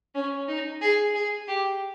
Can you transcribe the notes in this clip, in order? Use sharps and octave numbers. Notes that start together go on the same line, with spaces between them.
C#4
D#4
G#4
G#4
G4